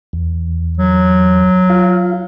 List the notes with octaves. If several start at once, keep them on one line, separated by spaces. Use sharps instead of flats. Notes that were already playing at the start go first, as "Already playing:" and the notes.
E2
F#3
F4 F5